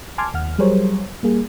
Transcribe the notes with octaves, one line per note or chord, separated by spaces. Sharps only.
G#5 A5 C6 D6 F6 G#6
D#2 F#5 F6
F#3 G3 G#4 A#4 C5 C#5
G3 A#3 G#4